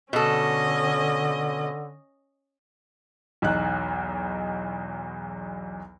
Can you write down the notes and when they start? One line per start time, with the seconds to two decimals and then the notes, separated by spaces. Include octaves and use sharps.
0.13 B2 D3 C#4 A4 D#5
3.42 B1 E2 D#4 F#6